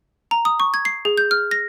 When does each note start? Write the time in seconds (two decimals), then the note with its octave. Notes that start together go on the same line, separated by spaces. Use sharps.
0.31 A#5
0.45 D#6
0.60 C#6
0.74 G#6
0.85 C7
1.05 G#4
1.17 G6
1.31 F6
1.51 A#6